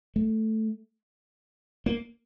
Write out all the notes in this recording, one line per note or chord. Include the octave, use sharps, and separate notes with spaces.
A3
A#3